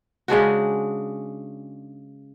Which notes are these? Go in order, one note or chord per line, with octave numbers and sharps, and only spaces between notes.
C#3 G#3 D4 F#4